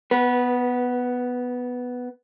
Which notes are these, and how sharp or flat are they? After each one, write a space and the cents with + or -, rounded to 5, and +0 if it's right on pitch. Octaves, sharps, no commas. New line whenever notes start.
B3 +5 B4 -20